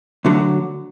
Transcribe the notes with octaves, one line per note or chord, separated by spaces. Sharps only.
D2 D3 F#3